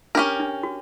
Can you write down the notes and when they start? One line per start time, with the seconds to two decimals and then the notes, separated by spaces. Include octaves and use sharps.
0.15 C#4 D4 G4 A#4
0.40 D4
0.63 F#4